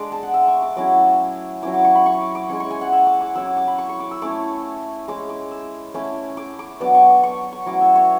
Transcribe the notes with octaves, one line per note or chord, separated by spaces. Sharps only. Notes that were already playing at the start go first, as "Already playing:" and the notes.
Already playing: G#3 D4 D6
A5
F#5
E5
C#6
D6
F#3 A3 C#4 E4 D6
F#3 C#4 E4 D6
D6
C#6
B5
C#6
D6
D6
G#3 C#4 E4 C#6
C#6
G#5
F#5
E5
D6
D6
F#3 C#4 E4 E6
D6
D6
B5
C#6
C#6
D6
E6
A3 C#4 E4 D6
G#3 C#4 E4 D6
D6
E6
A3 C#4 E4 D6
D6
D6
F#3 B3 D4 D6
C#6
D6
C#6
C#6
F#3 A3 C#4 E4 D6
E5
C#5